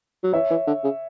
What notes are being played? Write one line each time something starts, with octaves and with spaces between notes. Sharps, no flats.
F#3
E3 C#5 E5
E3
D3
C#3